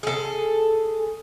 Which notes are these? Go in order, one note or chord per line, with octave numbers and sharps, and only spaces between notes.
G#4 A4